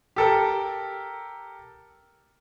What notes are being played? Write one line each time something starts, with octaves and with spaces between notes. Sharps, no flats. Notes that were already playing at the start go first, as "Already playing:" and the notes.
G4 A4 A#4